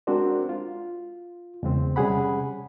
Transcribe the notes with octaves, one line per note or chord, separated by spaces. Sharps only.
G#3 C4 D4 F#4 A#4 C5
F4
E2 C#3 G#3 C4
C3 G3 C#4 G#4 F#5 B5